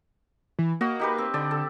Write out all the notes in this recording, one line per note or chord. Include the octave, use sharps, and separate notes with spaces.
E3
A#3 F#4 D#5
D#4 G4 B4
C4
D3 D5
A4